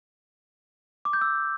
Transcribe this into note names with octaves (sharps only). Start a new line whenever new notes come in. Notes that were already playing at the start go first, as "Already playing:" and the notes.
D6
G6
E6